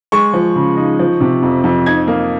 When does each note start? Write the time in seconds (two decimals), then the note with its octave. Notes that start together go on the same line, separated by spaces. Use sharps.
0.12 G#3 C#6
0.33 F3
0.55 C#3
0.77 D#4
0.99 F3
1.20 C3
1.42 F2
1.64 F2
1.86 D#4 G#6
2.07 A#3